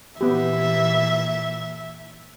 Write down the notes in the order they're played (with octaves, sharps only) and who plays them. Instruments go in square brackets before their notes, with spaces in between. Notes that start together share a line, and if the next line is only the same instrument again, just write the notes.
[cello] A#2 E3 [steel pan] B3 G4 [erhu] E5